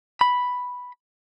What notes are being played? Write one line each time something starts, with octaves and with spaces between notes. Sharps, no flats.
B5